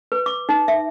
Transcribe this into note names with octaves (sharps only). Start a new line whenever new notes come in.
B4
D6
D#4
E5